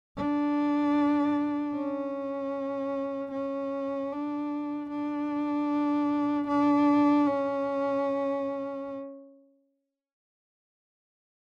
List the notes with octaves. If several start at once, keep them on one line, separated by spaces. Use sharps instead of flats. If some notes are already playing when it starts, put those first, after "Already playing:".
D4
C#4
C#4
D4
D4
D4
C#4